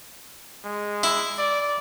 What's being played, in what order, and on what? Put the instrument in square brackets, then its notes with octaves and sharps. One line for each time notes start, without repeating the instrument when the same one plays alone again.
[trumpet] G#3
[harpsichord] E4
[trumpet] D5